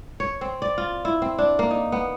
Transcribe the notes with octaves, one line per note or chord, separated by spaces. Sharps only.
C#5
C4
D5
F4
E4
C4
D4
A#3
D#4
B3